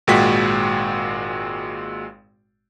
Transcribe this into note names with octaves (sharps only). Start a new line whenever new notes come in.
G#1 A#2 G#3 F#4 G5 B6